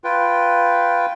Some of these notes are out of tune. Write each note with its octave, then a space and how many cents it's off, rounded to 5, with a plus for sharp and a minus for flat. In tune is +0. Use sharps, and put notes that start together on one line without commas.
F4 +0 B4 +0 G5 +0